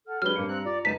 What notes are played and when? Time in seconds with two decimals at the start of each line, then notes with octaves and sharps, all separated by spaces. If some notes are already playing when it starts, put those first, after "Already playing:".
0.07 A4 F#5 F6
0.22 F#3 G#3 D4 G4 B4 C#5 F6 G7
0.36 G2 A#3 C#7
0.48 C4 A#5 F#6
0.65 F4 D5
0.85 C#2 F#2 D#4 B4 A5 B6 D#7